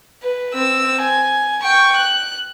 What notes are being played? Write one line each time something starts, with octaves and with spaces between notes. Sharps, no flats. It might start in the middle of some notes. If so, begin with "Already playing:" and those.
B4
C4 E6
G#5
G5 C#6
F#6